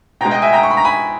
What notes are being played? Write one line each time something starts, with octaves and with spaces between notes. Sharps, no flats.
B2 G#3 G5 A#5
D#5 G5
E5 G#5
G5 A#5
C#6
B5
A#5
G#5 B5